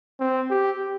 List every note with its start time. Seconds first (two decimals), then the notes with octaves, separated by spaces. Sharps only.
0.20 C4
0.50 G4